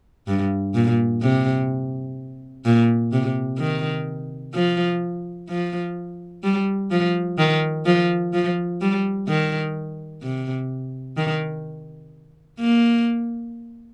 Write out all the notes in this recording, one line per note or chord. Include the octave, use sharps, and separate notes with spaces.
G2
A#2
C3
A#2
C3
D#3
F3
F3
G3
F3
D#3
F3
F3
G3
D#3
C3
D#3
A#3